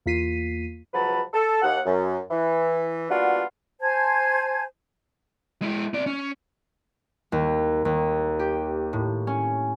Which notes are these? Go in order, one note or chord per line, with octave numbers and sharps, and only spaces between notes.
E2 A#3 F4 B6 C7 D#7
C#2 F3 F#3 B4 A5 B5
A4
D#2 F#5
F#2
E3
G3 A#3 B3 D4 F4 F#4
C5 G#5 A5 G#6
G#3 E4
C4 D5
C#4
D#2
D#2
G4
A2
C#4